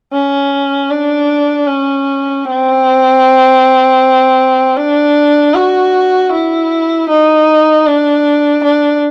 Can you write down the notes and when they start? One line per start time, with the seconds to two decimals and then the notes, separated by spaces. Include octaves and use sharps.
0.13 C#4
0.90 D4
1.67 C#4
2.45 C4
4.77 D4
5.54 F#4
6.32 E4
7.09 D#4
7.86 D4
8.64 D4